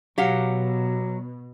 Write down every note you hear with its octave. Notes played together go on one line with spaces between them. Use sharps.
B2 F#3 G4 F5 F#5